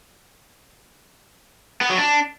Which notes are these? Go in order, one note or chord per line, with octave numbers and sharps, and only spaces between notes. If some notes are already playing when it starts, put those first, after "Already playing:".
B3
F#3
D4